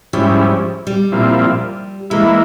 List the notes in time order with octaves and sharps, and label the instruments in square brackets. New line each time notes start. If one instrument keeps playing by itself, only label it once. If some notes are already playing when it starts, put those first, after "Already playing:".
[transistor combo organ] G#2 G3 C#4 E4 [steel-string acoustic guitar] F3
[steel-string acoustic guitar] G3
[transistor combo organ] A#2 F3 C4 E4
[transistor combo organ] E3 A#3 E4 [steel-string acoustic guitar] G#3